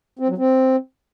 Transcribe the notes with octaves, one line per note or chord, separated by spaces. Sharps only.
C4
F#3
C4